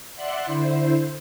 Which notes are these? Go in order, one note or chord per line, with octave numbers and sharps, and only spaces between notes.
D5 E5 F#5 C6 F#6
D3 E4 C5